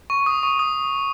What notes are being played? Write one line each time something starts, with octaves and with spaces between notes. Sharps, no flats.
C#6
D#6
C#6
D#6